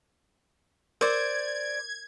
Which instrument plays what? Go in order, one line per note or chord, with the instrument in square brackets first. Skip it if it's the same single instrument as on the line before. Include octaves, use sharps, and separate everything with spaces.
[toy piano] A#4 [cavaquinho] C5 D5 [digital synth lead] G#6